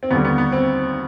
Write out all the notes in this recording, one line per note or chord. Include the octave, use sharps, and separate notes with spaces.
C4
D#2 D3 G3 B3
B3
B3
C4